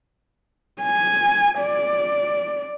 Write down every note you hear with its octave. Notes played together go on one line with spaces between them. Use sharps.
G#5
D5